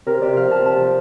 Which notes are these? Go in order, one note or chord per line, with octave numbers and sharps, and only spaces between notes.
C3 A#4
C3 D5
F3 F5
C3 A5
C3 A5
F3